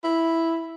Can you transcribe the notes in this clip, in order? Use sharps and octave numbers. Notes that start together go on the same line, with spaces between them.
E4